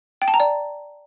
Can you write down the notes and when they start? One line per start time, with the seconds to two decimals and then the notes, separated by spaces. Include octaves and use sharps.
0.22 G5
0.28 A5
0.34 A#5
0.40 D5